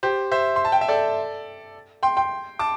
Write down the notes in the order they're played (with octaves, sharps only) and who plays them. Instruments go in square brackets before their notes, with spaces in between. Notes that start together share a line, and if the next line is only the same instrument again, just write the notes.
[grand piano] G4 C5
C5 E5
C6
A5
G5
E5
A4 D5
G5 C6
G5 C6
A5 D6